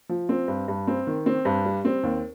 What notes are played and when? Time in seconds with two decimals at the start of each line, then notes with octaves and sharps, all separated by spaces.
0.09 F3
0.29 C4
0.48 G2
0.68 G2
0.87 C4
1.07 D#3
1.26 C4
1.45 G2
1.65 G3
1.85 C4
2.03 D#2